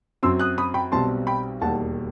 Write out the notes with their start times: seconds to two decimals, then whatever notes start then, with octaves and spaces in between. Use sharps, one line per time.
0.23 F#2 F#3 C4 C6 E6
0.39 D#6 F#6
0.58 B5 D#6
0.74 G5 B5
0.92 B1 B2 G3 C4 A5 C6
1.27 G5 B5
1.61 E1 D#2 D#3 G3 F#5 A5